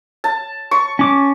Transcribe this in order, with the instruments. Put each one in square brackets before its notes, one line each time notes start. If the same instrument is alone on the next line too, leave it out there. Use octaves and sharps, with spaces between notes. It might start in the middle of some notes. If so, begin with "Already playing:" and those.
[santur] A5
C#6
[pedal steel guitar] C#4 D6